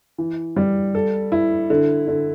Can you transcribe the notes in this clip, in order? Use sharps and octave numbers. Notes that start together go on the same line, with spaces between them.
E3
G3
A4
E4
D3
D3